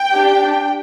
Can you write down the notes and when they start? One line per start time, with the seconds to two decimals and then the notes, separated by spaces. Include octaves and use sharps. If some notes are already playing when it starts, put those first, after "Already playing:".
Already playing: G5
0.12 D4 G4